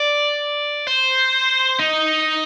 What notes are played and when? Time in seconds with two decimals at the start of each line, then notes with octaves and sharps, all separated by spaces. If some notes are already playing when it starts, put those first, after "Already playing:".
Already playing: D5
0.87 C5
1.80 D#4